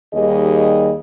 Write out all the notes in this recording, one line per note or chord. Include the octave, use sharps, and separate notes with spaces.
D#2 D#3 G3 G#4 D#5